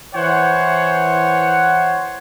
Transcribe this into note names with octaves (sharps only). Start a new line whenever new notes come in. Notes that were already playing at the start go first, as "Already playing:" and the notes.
E3 C5 C#5 F#5